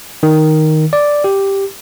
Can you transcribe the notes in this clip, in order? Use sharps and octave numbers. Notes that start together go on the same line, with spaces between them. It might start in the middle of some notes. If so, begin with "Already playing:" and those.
D#3
D5
G4